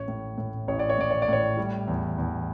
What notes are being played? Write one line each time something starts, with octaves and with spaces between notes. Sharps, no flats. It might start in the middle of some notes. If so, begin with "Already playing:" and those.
Already playing: A1 C#5
A2
A2
A1 C#5
D5
C#5
A2 D5
C#5
D5
A2 C#5
G3
E2
E2